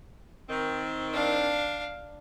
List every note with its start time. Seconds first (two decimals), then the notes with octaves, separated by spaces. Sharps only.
0.50 D#3 C4
1.13 D4 F5